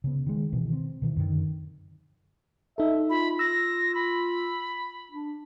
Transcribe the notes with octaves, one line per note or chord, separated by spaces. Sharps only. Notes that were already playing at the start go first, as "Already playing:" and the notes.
C#3 B3
D#3 G#3
B2 D#3 E3 C4
C4
B2 D#3 E3
F#2 D3 D#3
D#4 A4 E5
F4 B5
E6 A#6
B5
D4